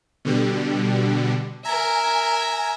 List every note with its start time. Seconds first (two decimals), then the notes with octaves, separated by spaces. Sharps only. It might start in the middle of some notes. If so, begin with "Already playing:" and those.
0.25 B2 D3 G3
1.65 A#4 E5 G#5 A#5